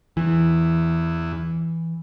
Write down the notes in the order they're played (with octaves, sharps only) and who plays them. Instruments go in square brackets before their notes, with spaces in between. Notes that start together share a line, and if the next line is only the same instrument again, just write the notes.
[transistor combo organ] E2 [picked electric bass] E3